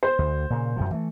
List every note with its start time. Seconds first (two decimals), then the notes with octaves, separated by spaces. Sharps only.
0.03 C5
0.19 D2
0.50 A#2 C#3
0.76 F#2 C3 F3
0.91 E3 F#3 A3